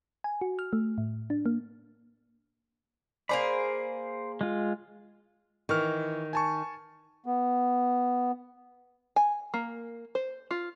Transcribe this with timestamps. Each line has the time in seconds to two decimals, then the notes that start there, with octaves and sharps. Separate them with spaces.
0.24 G#5
0.41 F#4
0.59 F6
0.73 A3
0.98 A2
1.30 D4
1.46 A#3
3.29 A#3 G#4 C5 D5 B5
4.41 G#3 F4
5.69 D#3 E3 C#6 F6
6.33 G#5 A5 C#6
7.26 B3
9.16 G#5
9.54 A#3
10.15 C5
10.51 F4